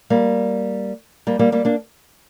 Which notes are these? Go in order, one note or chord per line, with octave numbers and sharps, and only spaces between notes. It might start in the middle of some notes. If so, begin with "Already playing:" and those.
G3 A#3
G3 A#3
G3 A#3
G3 A#3
A#3 D4